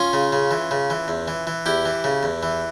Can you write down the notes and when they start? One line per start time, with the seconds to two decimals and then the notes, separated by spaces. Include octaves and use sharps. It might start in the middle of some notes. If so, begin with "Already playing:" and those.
Already playing: C#4 F4
0.13 C#3
0.32 C#3
0.51 E3
0.71 C#3
0.90 E3
1.08 E2
1.28 E3
1.47 E3
1.66 E2 E4 G4
1.86 E3
2.04 C#3
2.23 E2
2.43 E3